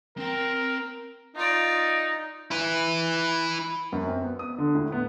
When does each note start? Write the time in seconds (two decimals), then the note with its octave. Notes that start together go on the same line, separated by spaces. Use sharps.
0.18 C4 A#4 G5
1.35 D#4 F4 D5
2.51 E4 B4
3.92 F#2
4.07 C4
4.22 B3
4.39 D#6
4.58 D3
4.75 A2
4.92 B3